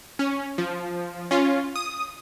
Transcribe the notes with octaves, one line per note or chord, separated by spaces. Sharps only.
C#4
F3
C#4 F4
D#6